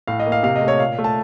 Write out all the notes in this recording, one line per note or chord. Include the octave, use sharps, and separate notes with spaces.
A2 F5
D#5
A#3
F5
C3 F5
D#5
A3
C#5
A#2 F5
A3
A5